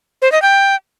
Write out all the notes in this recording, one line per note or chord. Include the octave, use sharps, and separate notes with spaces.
C5
D#5
G5